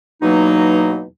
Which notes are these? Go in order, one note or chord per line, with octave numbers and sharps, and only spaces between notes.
E2 B2 F#3 A#3 D#4